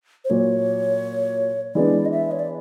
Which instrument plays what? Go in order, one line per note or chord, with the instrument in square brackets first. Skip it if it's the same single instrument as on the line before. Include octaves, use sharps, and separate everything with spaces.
[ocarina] C5
[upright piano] A#2 F#3 A#3 [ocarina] C#5
[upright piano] E3 G#3 B3 D4 [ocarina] D5
[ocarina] D#5
E5
C#5
D5